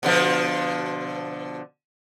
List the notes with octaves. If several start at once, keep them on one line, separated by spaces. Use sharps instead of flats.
B2 D3 F3